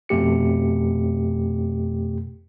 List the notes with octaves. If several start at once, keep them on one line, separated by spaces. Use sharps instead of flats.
F2 B2 A3 G4 C#7